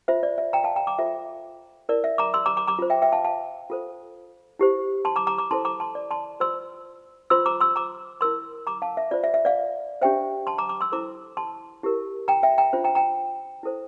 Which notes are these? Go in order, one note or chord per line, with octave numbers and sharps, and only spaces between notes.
F4 C5 E5
D5
E5
G5 A#5
F5 A5
G5 A#5
A#5 D6
F4 A4 C5 E5
E4 A#4 D5
E5
A#5 D6
C6 E6
A#5 D6
A#5 D6
A#5 D6
F4 C5
E5 G5
E5 G5
F5 A5
F5 A5
F4 A4 C5
E4 G4 C5
A5 C6
A#5 D6
A#5 D6
A#5 D6
E4 A4 C5 A5 C6
A#5 D6
A5 C6
D5
A5 C6
F4 C5 C6 E6
F4 C5 C6 E6
A#5 D6
C6 E6
A#5 D6
E4 A#4 C6 E6
A#5 D6
F5 A5
E5
F4 C5 D5
E5
E5
D5 F5
D4 G4 C5 E5 G5
A5 C6
A#5 D6
A#5 D6
C6 E6
E4 A4 C5 A#5 D6
A5 C6
E4 G4 A#4
G5 A#5
E5 G5
G5 A#5
D4 F4 C5
G5 A#5
G5 A#5
E4 A4 C5